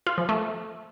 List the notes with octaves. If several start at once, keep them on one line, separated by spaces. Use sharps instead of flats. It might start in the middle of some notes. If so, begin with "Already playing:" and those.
F4
F3
A3